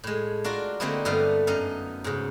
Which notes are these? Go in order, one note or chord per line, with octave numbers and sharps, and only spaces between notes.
A2 G#3
D4 F4 F#4 A#4
D3 A3 A#3 C4 D#4 E4
G2 D3 G3 A3 B3 F5
F#2 D#4 F5
G#2 C#3